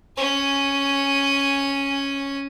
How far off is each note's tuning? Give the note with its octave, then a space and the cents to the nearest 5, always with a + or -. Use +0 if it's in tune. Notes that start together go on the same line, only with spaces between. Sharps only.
C#4 +0 G#5 +0